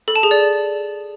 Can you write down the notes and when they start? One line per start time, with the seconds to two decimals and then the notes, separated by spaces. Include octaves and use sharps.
0.08 A4
0.16 A5
0.23 G#4
0.31 D5